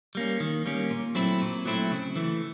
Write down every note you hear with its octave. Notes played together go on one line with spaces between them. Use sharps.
G3 A#3 C#4
D#3
G3 A#3 C#4
A#2
F#3 A3 C4 E4
A#2
F#3 A3 C4 E4
C#3
E3 A3